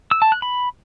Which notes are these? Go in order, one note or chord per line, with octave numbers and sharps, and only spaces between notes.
E6
A5
F#6
B5